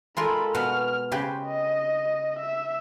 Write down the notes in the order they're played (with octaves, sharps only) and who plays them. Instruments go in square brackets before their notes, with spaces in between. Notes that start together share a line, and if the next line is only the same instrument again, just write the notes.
[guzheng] G#3 F4 A#4 [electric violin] A4 B5
[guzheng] B2 B4 F#5 [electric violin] F6
[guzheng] C#3 G4 B4 [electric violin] C5
[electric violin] D#5
E5